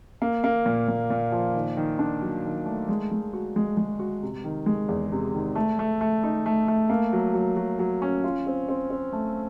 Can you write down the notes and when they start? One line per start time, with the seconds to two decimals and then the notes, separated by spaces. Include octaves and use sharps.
0.22 A#3
0.44 A#3
0.66 A#2
0.88 A#2
1.10 A#2
1.32 F3
1.55 D#3
1.77 D#3
1.99 D4
2.22 F#3
2.44 D#3
2.66 A3
2.89 G#3
3.11 G#3
3.33 F#4
3.56 G#3
3.77 G#3
3.99 F#4
4.23 C3
4.44 D#3
4.66 G#3
4.89 E2
5.12 C3
5.34 D#3
5.55 A3
5.79 A3
6.01 A3
6.24 D#4
6.46 A3
6.68 A3
6.90 A#3
7.13 F#3
7.34 F#3
7.56 F#3
7.79 F#3
8.02 C#4
8.24 F4
8.47 C4
8.69 C4
8.90 C4
9.13 A3